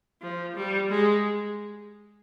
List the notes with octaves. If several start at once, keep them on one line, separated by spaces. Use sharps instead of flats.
F3
G3
G#3